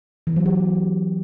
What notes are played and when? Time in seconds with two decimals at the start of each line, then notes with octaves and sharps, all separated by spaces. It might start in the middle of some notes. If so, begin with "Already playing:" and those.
0.27 E3
0.36 F#3
0.46 G4